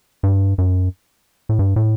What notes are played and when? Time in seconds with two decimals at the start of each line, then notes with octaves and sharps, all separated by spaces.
0.23 G2
0.58 F#2
1.49 A2
1.59 G2
1.76 A2